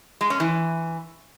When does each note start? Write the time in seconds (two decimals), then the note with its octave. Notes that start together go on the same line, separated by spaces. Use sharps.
0.21 G#3
0.30 C#4
0.40 E3